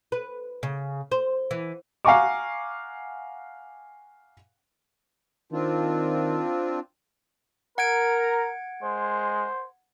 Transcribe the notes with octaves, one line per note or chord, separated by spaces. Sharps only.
B4
C#3
C5
E3
F5 F#5 G#5 A#5 C#6 D6
D#3 C4 D4 F4
A#4 F#5 A#5 G#6 D7
G#3 C5